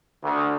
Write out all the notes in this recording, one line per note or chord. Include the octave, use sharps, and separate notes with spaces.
D2